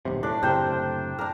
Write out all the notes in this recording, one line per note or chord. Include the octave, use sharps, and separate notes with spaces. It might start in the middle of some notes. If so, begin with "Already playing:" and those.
D#1 B1 C3
A2 D4
F#1 A2 C3 A#4 C5 G5
D4 A#4